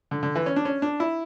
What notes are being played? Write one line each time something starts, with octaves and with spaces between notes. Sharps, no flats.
D3
D3
E3
C#4
D4
C#4
D4
E4